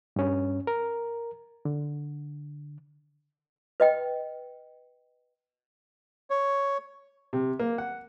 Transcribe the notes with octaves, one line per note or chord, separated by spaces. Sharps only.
G2 C#4
A#4
D3
B4 D#5 G5
C#5
C3
A#3
F#5